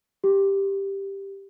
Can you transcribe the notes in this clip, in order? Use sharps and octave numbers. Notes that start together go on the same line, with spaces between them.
G4